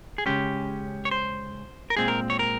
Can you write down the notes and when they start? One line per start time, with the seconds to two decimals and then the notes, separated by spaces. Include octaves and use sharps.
0.18 G#4
0.26 C#3 G#3 C#4 G4
1.05 C#5
1.11 C5
1.90 A#4
1.97 A#2 G#3 C4 G#4
2.08 A#4
2.30 C#5
2.39 A#4